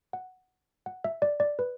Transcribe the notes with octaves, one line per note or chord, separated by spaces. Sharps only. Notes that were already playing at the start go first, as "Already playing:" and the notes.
F#5
F#5
E5
D5
D5
B4